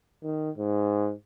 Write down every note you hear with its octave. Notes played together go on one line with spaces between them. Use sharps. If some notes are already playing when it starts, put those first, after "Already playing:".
D#3
G#2